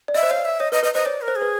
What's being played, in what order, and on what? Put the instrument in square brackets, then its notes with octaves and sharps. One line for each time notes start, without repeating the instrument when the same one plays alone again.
[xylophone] D5
[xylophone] D#5 [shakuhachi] E5
[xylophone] C5
[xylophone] C#5 [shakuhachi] F5
[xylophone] D5
[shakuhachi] E5
[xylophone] C#5 [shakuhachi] D#5
[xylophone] B4 [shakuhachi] D#5
[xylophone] B4 [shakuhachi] D#5
[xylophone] C5 [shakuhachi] D#5
[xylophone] C#5 [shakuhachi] D5
[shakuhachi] A#4
[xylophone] C5
[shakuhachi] G#4
[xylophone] B4